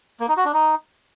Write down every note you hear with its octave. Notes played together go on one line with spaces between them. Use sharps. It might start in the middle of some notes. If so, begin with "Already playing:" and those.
A#3
D#4
F#4
D4
D#4